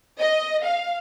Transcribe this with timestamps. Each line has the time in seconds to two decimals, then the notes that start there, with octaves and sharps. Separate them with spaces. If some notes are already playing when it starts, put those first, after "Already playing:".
0.20 D#5
0.63 F5